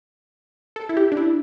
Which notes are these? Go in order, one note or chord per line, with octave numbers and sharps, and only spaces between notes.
A4
E4
G4
D4
E4